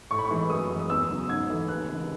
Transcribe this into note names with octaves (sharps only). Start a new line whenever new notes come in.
A2 C#6
B5
C#6
E3 G#3
F#2 D#6
E3 G#3
D#6
E2 E6
C#3 F#3
G#2 G#6
E3 A3
D#2 F#6
C#3 E3 G#3